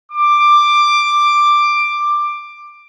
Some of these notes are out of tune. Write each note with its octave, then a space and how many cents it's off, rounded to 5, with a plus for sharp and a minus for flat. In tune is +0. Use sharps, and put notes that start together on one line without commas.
D6 +10